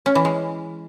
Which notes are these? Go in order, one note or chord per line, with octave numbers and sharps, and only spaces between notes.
C#4
E3
G#3